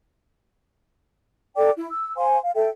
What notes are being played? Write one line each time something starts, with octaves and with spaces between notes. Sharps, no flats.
A4 D5 G5 D6
E4
E6
C5 F5 G#5 C6
F5
A4 E5 G5